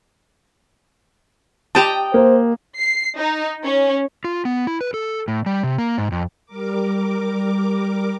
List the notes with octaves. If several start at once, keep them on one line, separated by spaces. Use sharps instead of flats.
G4 D#5 G5 A5 A#5
A#3 C5
C7
D#4
C#4
F4
B3
E4
B4
A4
A2
G3
C3
A#3
G#2
F2
G3 A#4 D6